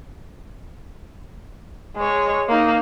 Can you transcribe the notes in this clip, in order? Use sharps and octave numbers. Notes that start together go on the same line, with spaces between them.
G#3 C#5
A#3 D#4